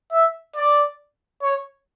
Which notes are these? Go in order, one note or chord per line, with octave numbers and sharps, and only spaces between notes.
E5
D5
C#5